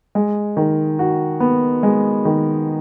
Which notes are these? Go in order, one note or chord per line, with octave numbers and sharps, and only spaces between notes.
G#3
D#3
F#4
B3
G#3
D#3